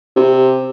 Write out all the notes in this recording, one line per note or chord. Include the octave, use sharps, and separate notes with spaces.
C3